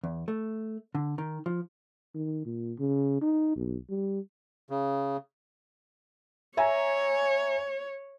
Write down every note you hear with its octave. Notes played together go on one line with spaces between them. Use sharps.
E2
A3
D3
D#3
F3
D#3
A#2
C#3
D#4
B1
G3
C#3
C#5 E5 G#5 A#5